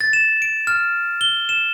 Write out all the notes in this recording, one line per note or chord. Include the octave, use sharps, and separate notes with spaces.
A6
E7
D7
F6
G7
E7